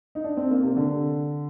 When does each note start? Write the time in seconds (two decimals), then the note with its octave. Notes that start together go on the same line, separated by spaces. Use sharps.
0.15 D#4
0.24 D4
0.37 C4
0.51 A#3
0.63 C3
0.76 D3